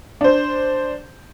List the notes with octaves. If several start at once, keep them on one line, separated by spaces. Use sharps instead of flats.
D4 C5